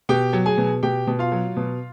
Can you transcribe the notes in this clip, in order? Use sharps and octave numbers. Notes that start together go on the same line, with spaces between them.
B2 G4 G5
F#3
G#4 G#5
B2
B2 G4 G5
B2
F4 F5
F#3
B2